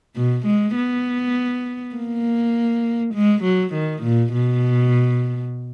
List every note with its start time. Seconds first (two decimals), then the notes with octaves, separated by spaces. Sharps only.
0.16 B2
0.46 G#3
0.76 B3
1.96 A#3
3.14 G#3
3.43 F#3
3.74 D#3
4.03 A#2
4.32 B2